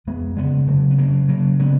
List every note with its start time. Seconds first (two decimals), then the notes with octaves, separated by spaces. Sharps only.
0.07 F2 G#3 B3
0.37 C#3 G#3 B3
0.67 C#3 F#3 A#3
0.90 B3
0.98 C#3 F#3 A#3
1.28 C#3 F#3 A#3
1.59 C#3 G#3 B3